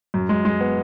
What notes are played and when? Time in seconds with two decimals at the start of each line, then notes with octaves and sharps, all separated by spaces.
0.14 F#2
0.29 G#3
0.45 G#3
0.61 B3